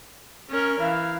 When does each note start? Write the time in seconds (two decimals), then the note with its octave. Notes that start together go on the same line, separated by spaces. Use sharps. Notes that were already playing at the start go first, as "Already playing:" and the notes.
0.50 C#4 A#4
0.81 E3 F5